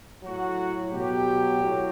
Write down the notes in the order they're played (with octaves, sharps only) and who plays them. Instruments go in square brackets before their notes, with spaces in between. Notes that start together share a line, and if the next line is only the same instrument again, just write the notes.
[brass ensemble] A2 F#3 F#4
B2 F#3 G4
A2 F#3